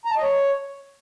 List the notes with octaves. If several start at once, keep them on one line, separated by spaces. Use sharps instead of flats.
A#5
A5
D#5
C#5